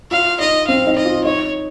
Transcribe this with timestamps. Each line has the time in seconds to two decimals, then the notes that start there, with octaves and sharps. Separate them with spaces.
0.11 F4 F5
0.40 D#4 D#5
0.67 C4 F5
0.87 D#4
0.96 D#5
1.05 F4
1.24 D#4 C#5